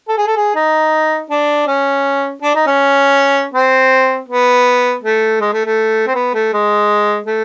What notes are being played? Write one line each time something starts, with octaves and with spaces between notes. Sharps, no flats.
A4
G#4
A4
G#4
D#4
D4
C#4
D4
D#4
C#4
C4
B3
A3
G#3
A3
A3
C4
B3
A3
G#3
A3